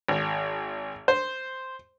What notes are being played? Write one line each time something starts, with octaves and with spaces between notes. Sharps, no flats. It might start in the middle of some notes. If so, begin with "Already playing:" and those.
G#1
C5